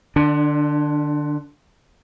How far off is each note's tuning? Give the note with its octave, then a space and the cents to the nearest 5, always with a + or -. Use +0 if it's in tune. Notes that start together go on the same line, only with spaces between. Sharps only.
D3 +35 D4 +0